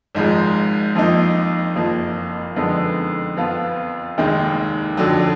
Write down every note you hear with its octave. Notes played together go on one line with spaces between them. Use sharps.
G#1 G#2 F3 G#3
F2 F3 A#3 D#4
F#1 F2 F3 A#3
F2 D3 G#3 B3 D#4
F2 F3 B3 F4
F1 D#2 D#3 G#3
F2 D3 F#3